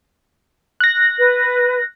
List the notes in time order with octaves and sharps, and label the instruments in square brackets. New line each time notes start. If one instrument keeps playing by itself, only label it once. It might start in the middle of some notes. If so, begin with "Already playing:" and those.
[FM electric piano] F#6 A#6
[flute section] B4